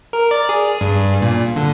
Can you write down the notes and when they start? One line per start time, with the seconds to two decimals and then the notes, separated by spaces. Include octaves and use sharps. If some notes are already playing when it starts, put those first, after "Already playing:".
0.13 A#4
0.31 D5
0.49 G#4
0.81 G2
1.22 A#2
1.56 D3